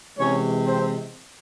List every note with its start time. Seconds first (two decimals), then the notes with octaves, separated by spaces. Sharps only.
0.18 C3 E3 G#3 C#4 C#5
0.66 C4 C5